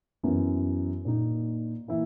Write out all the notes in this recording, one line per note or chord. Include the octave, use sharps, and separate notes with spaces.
F#2 E3 B3 E4
A#2 A#3 D#4
E3 A#3 E4